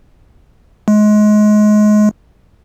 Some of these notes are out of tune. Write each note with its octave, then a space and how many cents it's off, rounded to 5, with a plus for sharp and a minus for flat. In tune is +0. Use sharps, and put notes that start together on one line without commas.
G#3 +25